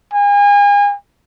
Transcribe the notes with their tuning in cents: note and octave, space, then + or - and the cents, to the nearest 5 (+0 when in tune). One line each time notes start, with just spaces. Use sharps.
G#5 -35